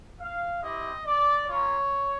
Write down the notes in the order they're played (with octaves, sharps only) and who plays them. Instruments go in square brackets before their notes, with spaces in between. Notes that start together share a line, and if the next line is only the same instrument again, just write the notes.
[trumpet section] F5
C4 E4 G4 D#5
D5
A#3 C#4 F4 C#5